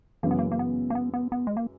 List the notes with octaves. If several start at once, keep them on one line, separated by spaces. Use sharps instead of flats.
F#2 C#3 E3 G#3 A#3
B3
A#3
A#3
B3
A#3
B3
B3
B3
G#3
A#3